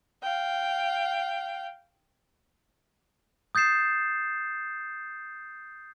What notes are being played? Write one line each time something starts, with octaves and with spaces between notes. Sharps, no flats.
F5 G5
D#6 G6 A6 C7 E7